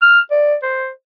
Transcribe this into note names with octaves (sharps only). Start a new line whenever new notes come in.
F6
D5
C5